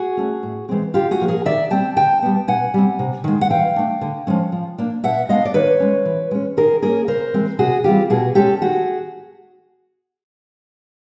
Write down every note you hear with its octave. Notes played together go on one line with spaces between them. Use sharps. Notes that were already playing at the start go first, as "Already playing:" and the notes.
Already playing: F#4 G#4
A3 C#4
A2
E3 G#3 C4
D3 F4 G4
F#4 G#4
F3 A#3
G#4 A#4
D#3 D5 E5
G3 C4 G5 A5
D3 G5 A5
G3 B3
B2 F#5 G#5
G3 C4
C3
D#3 G#3
F#5
E3 F5 G5
A3 D4
D3
F3 G#3 C#4
F3
A#3 D4
B2 E5 F#5
G#3 B3 D4 D#5 F5
D5
D#3 B4 C#5
G#3 C#4
E3
G#3 C#4
D#3 G#4 A#4
G3 A#3 C#4 G#4 A#4
C#3 A#4 C5
E3 G#3 C4
C3 F#4 G#4
E3 G3 C4 F4 G4
B2 F#4 G#4
G#3 C#4 G4 A4
D#3 F#4 G#4